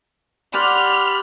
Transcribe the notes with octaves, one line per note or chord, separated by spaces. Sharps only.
G4 D5 F#5 B5 C6 F6